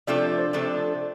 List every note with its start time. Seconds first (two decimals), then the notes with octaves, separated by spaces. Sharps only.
0.07 C3 F3 A3 D4 A4 D5
0.23 D5
0.38 C5
0.53 C3 F3 A3 D4 A4